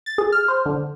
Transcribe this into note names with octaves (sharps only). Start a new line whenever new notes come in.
A6
G#4
F6
C5
D3